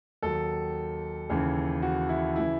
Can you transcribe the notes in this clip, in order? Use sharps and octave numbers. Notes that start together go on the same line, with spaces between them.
D#2 D#3 F#3 A4
D#2 C#3 E3
F#4
E4
C#3 E3 E4